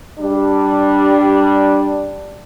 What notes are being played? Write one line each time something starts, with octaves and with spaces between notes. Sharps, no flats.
G3 D4